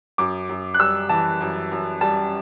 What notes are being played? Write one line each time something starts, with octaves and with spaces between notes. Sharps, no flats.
F#2 D6
F#2
F#6
G3 E6
E3 A5
F#2
F#2
G3 A5